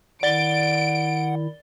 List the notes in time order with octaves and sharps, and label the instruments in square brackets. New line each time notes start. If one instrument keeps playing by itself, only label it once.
[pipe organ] D#3 E4 [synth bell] D5 A6 G7 [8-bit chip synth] F#5 [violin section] D7